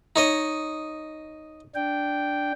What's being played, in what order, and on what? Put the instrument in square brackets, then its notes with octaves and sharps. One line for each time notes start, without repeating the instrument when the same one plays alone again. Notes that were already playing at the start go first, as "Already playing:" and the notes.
[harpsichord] D#4 C#5 D#5
[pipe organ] D4 G5